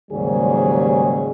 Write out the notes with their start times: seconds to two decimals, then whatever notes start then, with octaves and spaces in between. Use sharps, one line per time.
0.11 D#2 G#2 C#3 F#3 G3 G#4